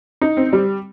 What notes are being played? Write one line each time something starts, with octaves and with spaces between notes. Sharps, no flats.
D#4
C4
G3